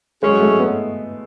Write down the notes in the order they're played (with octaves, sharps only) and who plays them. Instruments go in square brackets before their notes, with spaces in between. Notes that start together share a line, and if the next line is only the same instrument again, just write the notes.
[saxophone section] F#3 C#4 G#4 C#5 [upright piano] G#3
[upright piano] A3
B3